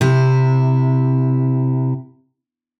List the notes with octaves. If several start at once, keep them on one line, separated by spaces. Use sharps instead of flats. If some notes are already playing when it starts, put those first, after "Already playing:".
C3 E4